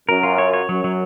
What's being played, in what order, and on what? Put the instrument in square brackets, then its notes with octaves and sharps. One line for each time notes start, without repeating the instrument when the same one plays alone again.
[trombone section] F#2 [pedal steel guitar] A#4
[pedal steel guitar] F4
C#5
C#5
[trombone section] F#2 [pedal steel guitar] F#3
[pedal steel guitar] F#3